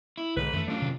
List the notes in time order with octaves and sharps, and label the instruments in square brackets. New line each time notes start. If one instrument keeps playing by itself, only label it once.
[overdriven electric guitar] E4
[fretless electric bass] B1 D3 [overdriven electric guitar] G#2 [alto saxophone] B4
[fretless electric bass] F#2 D#3 E3 [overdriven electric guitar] A3
[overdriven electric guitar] F#2 F4 [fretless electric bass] A3 [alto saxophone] D4
[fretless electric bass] C3 D#3